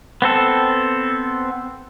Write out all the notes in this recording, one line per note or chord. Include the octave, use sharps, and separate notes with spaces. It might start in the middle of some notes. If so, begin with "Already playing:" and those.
B3 C4 A4